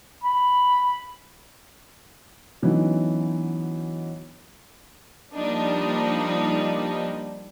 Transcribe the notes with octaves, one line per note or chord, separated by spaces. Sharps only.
B5
D3 E3 F#3 B3 C#4 D#4
F3 G3 A#3 D4 D#4